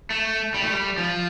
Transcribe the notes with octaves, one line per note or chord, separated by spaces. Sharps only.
A3
G3
A3
G3
F3